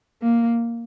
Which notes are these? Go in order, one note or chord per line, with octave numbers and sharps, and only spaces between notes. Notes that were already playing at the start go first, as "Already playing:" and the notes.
A#3